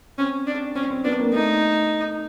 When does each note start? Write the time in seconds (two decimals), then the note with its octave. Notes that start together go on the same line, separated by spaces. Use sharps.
0.18 C4 C#4
0.47 D4
0.75 C4 C#4
0.90 C4
1.04 B3 D4
1.19 A#3
1.32 A3 D#4